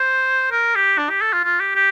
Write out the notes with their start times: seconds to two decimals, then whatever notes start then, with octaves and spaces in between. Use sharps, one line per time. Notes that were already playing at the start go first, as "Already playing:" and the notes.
Already playing: C5
0.51 A#4
0.75 G4
0.98 D4
1.09 G4
1.21 A4
1.33 F4
1.44 F4
1.60 G4
1.75 G4